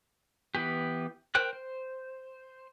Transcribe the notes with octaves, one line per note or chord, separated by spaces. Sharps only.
E3 B3 G4
A#4 C5 G5 F#6
C5